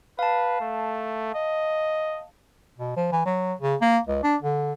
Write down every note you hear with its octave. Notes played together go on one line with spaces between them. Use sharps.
B4 F5 A5
A3
D#5
B2
F3
E3
F#3
C#3
A#3
C#2
D4
D3